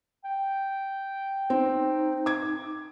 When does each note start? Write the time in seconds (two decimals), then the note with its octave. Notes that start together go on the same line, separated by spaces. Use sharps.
0.24 G5
1.50 C4 D#4
2.26 D6 G#6